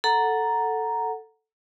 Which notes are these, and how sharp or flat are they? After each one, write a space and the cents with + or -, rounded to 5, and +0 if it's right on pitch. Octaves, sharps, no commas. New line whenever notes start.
A4 +0 F#5 +0 A#5 +0